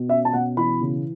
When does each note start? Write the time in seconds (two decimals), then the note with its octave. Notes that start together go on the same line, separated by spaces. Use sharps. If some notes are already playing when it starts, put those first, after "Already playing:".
Already playing: B2
0.09 C#4 E5
0.25 A5
0.33 B2 F#5
0.57 E3 B5
0.81 C#3